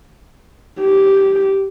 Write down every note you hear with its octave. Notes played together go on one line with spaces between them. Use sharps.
G4